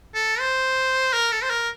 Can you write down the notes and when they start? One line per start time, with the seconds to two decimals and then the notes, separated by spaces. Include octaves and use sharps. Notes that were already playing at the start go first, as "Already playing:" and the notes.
0.15 A4
0.40 C5
1.13 A#4
1.32 A4
1.43 C5
1.50 A#4